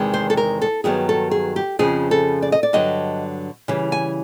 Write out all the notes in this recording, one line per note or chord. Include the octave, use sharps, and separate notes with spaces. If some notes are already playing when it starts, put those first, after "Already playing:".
Already playing: E2 C3 D#3 G#3
C5
A4
A#4
A4
G2 D#3 F#3 B3 G#4
A4
G#4
G4
F2 C#3 F3 G#4
A4
D5
D#5
D5
G2 D3 F#3 D#5
C#3 E3 G3
G#5